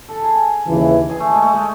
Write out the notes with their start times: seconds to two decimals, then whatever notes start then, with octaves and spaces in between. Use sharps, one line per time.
0.09 A4
0.22 G#4
0.66 D#2 C#3 E3
1.10 G#4
1.20 A3
1.31 G#3
1.42 A3
1.53 G#3